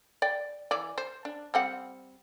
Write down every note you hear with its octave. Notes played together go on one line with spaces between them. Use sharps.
D5 G5
E3 D5
C5
D4
G3 C4 F#5